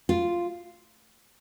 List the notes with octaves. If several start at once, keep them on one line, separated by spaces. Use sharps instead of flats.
F4